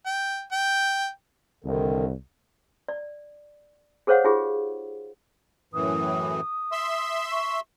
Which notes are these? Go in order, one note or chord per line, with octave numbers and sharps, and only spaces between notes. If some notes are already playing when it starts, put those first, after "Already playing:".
G5
G5
C2 D3 D#3
D5
G#4 A4 C5 C#5 F5 F#5
D#4 F4 G4 G#4
F#2 A2 E3 D#6
E5 C6 E6
C#6